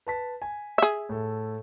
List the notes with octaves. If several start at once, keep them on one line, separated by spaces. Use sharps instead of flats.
B4 A5 B6
G#5
G#4 E5
A2 A4